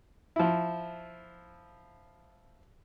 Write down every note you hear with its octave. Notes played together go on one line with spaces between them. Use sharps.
F3 E4